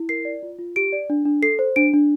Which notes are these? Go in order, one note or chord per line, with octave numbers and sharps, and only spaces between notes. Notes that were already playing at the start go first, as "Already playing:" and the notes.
Already playing: E4
A#4 C7
D5
F4
F4
G4 D7
D5
D4
D4
A4 C7
C5
D4 D7
D4